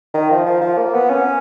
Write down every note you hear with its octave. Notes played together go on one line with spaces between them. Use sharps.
D#3
F3
F3
F3
A#3
B3
C#4